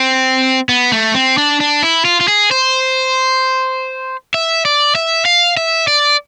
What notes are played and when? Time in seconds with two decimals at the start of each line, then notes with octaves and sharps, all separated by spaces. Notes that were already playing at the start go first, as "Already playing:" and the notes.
Already playing: C4
0.69 B3
0.92 A3
1.14 C4
1.38 D4
1.60 D4
1.83 E4
2.05 F4
2.21 F4
2.28 G#4
2.51 C5
4.34 E5
4.65 D5
4.95 E5
5.25 F5
5.57 E5
5.88 D5